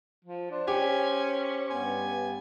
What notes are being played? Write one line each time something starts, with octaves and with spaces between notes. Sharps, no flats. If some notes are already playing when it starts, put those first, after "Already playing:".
F3
D4 C5
C#4 G4 G#5
G2 B3 G#5